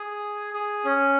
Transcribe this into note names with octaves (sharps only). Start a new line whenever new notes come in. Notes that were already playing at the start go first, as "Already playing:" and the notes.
Already playing: G#4
G#4
C#4